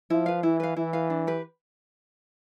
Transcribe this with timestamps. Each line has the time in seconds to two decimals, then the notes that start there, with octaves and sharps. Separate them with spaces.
0.10 F3 E4
0.26 B4 F5
0.43 E3 E4
0.60 B4 F5
0.76 E3 E4
0.93 B4 F5
1.10 D4
1.27 G4 B4